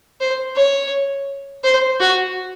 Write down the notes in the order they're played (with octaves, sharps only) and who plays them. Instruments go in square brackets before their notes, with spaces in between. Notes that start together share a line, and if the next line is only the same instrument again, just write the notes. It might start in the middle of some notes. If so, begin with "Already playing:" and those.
[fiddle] C5
C#5
C5
F#4